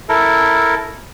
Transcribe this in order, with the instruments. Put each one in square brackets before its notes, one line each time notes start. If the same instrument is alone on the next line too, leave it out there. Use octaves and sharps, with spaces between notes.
[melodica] E4 A4 A#4